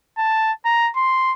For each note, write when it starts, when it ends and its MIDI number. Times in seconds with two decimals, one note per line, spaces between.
0.18 0.52 81
0.65 0.90 82
0.96 1.34 84